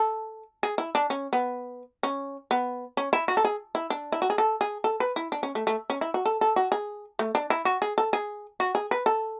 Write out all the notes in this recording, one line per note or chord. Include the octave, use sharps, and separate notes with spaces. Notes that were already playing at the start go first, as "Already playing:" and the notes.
Already playing: A4
G#4
E4
D4
C#4
B3
C#4
B3
C#4
E4
F#4
A4
G#4
E4
D4
E4
F#4
G#4
A4
G#4
A4
B4
E4
D4
C#4
A3
A3
C#4
E4
F#4
A4
A4
F#4
G#4
A3
D4
E4
F#4
G#4
A4
G#4
F#4
G#4
B4
A4